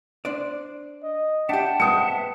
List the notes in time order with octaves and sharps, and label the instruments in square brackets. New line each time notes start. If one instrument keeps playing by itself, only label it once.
[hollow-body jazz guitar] D4 C5 D5
[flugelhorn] D#5
[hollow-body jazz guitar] D4 G4 [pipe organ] E5 F#5 A5 [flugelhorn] G5
[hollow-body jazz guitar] G#3 B3 C4 [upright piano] D#6 C#7